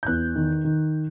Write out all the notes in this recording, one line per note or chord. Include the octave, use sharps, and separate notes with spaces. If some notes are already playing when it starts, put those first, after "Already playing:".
G6
E2 F#6
D#3
D#3